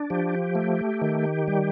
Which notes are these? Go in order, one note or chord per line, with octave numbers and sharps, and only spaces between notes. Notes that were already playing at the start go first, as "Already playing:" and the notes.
Already playing: D4
F3 G4
A3
D#3
G3